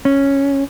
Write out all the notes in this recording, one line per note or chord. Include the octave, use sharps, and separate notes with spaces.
C#4